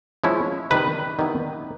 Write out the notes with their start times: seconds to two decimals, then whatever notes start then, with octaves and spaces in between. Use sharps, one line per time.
0.24 F3 G#3 C#4 E4
0.70 C3 D#3 G3 B4
1.19 D#3 G3 B3 E4